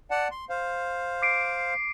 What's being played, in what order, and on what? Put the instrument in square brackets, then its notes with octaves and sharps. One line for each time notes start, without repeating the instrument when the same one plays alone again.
[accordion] D5 F#5 A5
C6
C5 F5
[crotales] D6 C7 D7